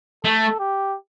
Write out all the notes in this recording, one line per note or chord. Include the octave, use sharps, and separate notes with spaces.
A3 A4
G4